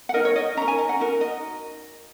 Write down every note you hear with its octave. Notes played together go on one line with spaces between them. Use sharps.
F#5
D#4 A#4 D#5
C#5
D#5
C#4 A#4 A#5
G#5
D#5
F#5
D#4 F#4 A#4
D#5